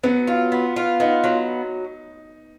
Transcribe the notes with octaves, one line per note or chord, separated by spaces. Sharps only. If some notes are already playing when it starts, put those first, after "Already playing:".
F#3 B3
F4
B3
F4
B3 D#4
F#3